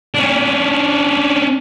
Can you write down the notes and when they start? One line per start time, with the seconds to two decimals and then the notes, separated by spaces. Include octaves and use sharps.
0.14 C#4 D4